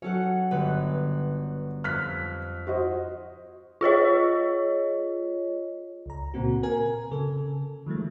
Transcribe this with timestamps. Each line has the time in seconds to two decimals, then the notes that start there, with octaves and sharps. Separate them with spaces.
0.02 F#3 C#4 A4 F#5
0.51 G1 B4
1.84 F2 F6 F#6 B6
2.67 F#4 C5 D#5
3.81 F4 G#4 C#5 D#5
6.06 C#2 A#5
6.34 A#2 C#3 A#3 C4 F#4
6.63 A#4 G#5
7.11 C#3 A4
7.86 D#3 F3 G#3 A3